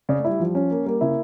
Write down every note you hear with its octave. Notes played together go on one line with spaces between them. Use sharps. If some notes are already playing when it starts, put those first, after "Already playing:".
C#3 D5
A3
G3 E4
F3
C#4
A#3
G3 A#3
C#3 E4